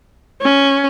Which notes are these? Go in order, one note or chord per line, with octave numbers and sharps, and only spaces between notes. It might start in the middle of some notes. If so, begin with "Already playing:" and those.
C#4